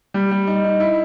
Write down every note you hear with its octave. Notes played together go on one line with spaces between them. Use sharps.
G3
G3
D#4
D#4
E4